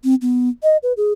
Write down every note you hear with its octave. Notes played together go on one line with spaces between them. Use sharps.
C4
B3
D#5
B4
G#4